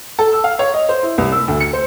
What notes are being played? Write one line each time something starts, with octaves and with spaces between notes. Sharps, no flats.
A4
E6
F5
C#5
D#5
C5
E4
C2
E6
D2
C#7
C5